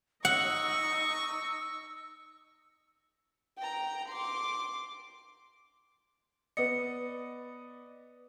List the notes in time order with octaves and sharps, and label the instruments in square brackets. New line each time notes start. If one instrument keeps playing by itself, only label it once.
[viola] D#4 D#5 [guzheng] F#5 [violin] C#6 [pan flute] E6
[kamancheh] G5 A#5
C6 D6
[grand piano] B3 D5 D#5 [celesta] B4 C#7